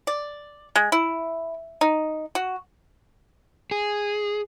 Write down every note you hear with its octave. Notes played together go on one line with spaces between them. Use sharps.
D5
G#3
E4
D#4
F#4
G#4